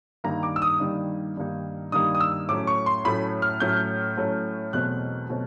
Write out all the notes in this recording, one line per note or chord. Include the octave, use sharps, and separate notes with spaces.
G2 D#3 G3 A#3 D#4 A#5
D6
E6
D#6
G2 D#3 G3 A#3 D#4
G2 D#3 G3 A#3 D#4
G2 D#3 G3 A#3 D#4 D#6
D#6
E6
A2 F#3 A3 C#4 D6
C#6
C6
A2 F#3 A3 C#4 B5
F6
A2 F#3 A3 C#4 G6
A2 F#3 A3 C#4
E2 B2 F#3 A3 C4 F#6
B2 F#3 A3 C4